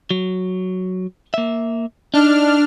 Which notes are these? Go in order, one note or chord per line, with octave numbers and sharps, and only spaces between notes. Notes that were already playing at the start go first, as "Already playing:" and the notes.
F#3
A#3 E5
D4 D#4 F6